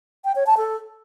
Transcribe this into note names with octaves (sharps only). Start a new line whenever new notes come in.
G5
C#5
A5
A4